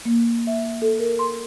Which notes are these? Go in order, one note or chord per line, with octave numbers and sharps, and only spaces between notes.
A#3
E5
A4
A#4
C6